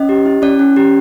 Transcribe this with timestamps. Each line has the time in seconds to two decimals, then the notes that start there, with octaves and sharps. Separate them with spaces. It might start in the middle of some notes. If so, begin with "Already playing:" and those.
Already playing: C#4 D#5
0.09 G4
0.26 E4
0.42 C#4 D5
0.59 C#4
0.76 G4